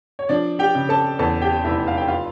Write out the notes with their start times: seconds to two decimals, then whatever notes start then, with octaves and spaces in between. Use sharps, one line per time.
0.19 C#5
0.29 F3 D4 D5
0.59 G4 G5
0.75 C#3
0.89 A4 A5
1.19 E2 A4 A5
1.42 G4 G5
1.64 F1 E4 E5
1.88 F5
1.97 G5
2.08 F4 F5